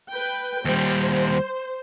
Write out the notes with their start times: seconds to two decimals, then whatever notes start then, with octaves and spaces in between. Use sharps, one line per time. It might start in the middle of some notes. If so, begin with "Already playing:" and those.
0.11 B4 G5
0.65 D#2 G3 C5